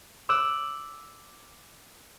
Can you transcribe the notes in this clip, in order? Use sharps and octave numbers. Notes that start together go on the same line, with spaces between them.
D6 E6 F#6